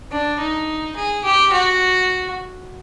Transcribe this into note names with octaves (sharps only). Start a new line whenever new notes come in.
D4
D#4
G#4
G4
F#4